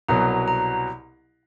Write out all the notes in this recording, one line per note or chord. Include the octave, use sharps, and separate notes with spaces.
C2 B2 F#3 A#5
A#5